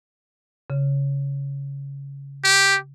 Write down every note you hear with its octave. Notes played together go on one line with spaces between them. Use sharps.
C#3
G4